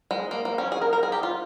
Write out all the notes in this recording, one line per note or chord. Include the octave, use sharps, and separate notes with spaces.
G#3
A#3
A#3
C#4
G#4
A#4
A#4
G#4
G4
F4